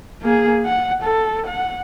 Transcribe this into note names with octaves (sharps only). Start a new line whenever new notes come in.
A#3 G#4
F#5
A4
F#5